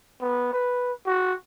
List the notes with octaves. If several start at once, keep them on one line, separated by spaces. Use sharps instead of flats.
B3
B4
F#4